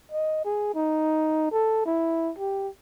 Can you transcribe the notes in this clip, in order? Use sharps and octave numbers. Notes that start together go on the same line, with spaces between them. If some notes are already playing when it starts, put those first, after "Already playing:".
D#5
G#4
D#4
A4
E4
G4